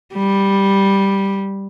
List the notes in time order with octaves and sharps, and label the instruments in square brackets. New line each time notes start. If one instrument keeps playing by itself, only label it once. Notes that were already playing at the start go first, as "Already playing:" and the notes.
[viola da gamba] G3